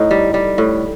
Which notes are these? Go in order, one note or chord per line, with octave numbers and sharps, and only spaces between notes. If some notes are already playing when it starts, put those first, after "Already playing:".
Already playing: A2 D#4
G3
G3
A2